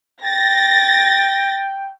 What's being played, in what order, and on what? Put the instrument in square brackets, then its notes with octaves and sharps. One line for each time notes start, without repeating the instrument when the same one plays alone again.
[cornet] G5 [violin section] A6 A#6